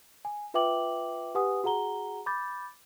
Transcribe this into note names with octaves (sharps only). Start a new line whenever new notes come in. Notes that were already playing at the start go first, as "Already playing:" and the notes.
G#5
F4 B4 E5 G5 D6 F#7
G4 B4 F#5 G#5 D#6
F#4 G#4 F#5 A#5 G7
B5 D6 G6 A6